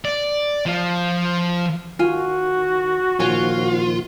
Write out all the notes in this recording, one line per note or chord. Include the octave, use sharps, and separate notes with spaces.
D5
F3 F4
D#3 F4 F#4 G#5
A#2 D#3 F3 F4 C#5 G#5